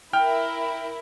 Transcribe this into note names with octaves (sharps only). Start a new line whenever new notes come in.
E4 A#4 G5 F6